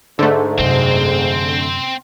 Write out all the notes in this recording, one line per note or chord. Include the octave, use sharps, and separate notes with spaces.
G#2 D3 A3
F#2 C3 C4 C5